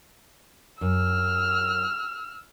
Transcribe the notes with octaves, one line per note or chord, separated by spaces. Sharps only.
F#2 E6 F6